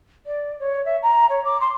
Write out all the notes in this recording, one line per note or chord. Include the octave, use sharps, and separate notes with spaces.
D5
C#5
E5
A#5
C#5
D6
C6